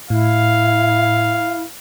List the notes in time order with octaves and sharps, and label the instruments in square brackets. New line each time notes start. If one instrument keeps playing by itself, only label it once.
[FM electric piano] A2 [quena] E4 [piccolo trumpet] F5